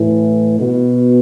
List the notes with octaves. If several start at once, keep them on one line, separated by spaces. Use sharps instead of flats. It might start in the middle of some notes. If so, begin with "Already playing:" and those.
Already playing: A2 E3
B2